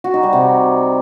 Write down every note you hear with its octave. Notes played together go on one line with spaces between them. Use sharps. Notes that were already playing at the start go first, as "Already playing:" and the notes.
F#4
D#4
G3
C3